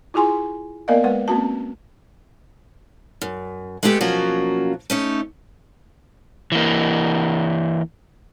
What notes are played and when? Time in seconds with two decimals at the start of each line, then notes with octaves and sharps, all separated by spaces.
0.14 E4 F4 G#4 G#5 C6
0.88 A#3 B3 A#4 D5 D#5 F5
1.04 G#3 B4 F#5
1.28 A#3 C4 C#4 F#4 A5
3.21 F#2
3.83 G#3 A3 B3 E4 G4 A4
4.01 B2 F3 F#3 A#3 C#4 F#4
4.90 A3 C#4 D#4
6.52 E3 A#3